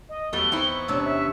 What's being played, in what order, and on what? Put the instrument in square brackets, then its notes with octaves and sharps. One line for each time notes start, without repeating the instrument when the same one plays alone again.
[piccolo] D#5
[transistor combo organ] E2 B3 C#6 [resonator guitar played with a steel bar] F#3 G3 A3 [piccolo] G7
[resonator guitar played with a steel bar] C4 D#4 E4
[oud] C3 C#4 D4 [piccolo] E6
[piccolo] E5